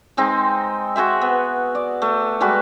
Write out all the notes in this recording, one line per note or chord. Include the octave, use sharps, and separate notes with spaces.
G#3 C4 D#4
F#4 G#4 C5 E5
B3
D5
A3
G3 G#3 F#4 B4